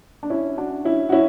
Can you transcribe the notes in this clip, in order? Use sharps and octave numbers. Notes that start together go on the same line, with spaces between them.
D4
C#4 E4
D4 F#4
C#4 E4
F#4
C#4 E4